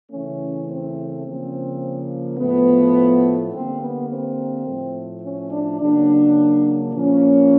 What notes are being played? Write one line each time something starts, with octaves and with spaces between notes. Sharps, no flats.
C#3 E3 A3 C#4
C4
C#3 F3 A#3
A2 F3 A3 B3
D3 G3 A#3 C4
B3
C4
A2 F3 A3
C#4
D4
C#3 F#3 A#3 D4
A#2 F3 A#3 C#4